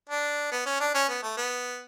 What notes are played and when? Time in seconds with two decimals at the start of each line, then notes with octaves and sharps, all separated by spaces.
0.09 D4
0.52 B3
0.66 C#4
0.80 D4
0.94 C#4
1.09 B3
1.23 A3
1.37 B3